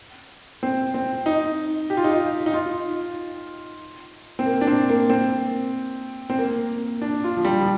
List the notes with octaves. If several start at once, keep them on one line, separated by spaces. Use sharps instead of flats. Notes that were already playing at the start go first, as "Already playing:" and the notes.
C4
C4
D#4
G4
F4
D#4
F4
D#4
F4
C4
A#3
D4
C4
A#3
C4
C4
A#3
D4
F4
F3
G3
F3